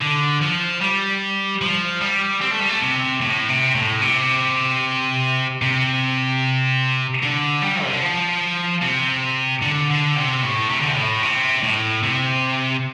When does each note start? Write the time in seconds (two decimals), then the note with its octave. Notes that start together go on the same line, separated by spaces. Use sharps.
0.01 D3
0.41 F3
0.81 G3
1.61 F3
2.01 G3
2.41 C4
2.51 A3
2.60 G3
2.69 A3
2.81 C3
3.21 A2
3.49 C3
3.75 A2
4.02 C3
5.62 C3
7.23 D3
7.62 G3
7.83 C3
7.93 D3
8.02 F3
8.82 C3
9.62 D3
9.90 D3
10.16 C3
10.43 A2
10.69 C3
10.81 D3
10.88 C3
10.96 A2
11.22 C3
11.63 A2
12.03 C3